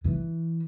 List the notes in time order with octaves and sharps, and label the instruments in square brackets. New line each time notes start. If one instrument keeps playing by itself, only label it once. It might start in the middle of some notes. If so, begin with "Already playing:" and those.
[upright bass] E3